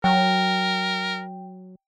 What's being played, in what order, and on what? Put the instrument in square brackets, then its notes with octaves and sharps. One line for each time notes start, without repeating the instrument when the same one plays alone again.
[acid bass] F#3 [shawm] A#4 [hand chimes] G5